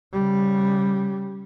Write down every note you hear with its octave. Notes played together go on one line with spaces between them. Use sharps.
C#3 G3